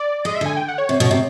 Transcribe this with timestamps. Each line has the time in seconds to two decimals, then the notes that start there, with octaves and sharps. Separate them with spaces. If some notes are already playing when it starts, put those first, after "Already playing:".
Already playing: D5
0.25 G#3 D#5
0.35 E5
0.41 D3 G#5
0.57 G5
0.68 F#5
0.78 C#5
0.89 C3
1.00 B2
1.11 C3